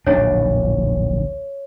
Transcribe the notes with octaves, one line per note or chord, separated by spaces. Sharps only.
D1 A#1 D4 C#5